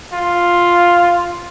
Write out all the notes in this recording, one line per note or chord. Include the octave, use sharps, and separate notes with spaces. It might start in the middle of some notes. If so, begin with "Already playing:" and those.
F4